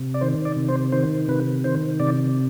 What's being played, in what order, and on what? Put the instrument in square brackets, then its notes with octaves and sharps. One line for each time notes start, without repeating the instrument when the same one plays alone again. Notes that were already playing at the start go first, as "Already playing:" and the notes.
Already playing: [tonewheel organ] C3
D5
D#3 C5
D5
C3
C5
D#3 C5
C3 B4
D#3 C5
C3 D5